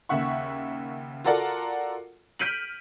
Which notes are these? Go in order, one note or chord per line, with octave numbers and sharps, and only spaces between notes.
D#2 C#3 E5 F#5 C#6
F4 F#4 A4 A#4 D5 F#5
F6 G6 B6 D7 D#7 F#7